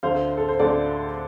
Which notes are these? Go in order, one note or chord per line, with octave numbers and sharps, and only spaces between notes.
D2 D3 A3 C5 F5
A4
C5
D2 D3 A3 A4 D5